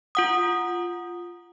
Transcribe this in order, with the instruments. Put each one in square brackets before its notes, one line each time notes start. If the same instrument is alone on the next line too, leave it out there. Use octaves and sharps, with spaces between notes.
[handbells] F4 F#5 D#6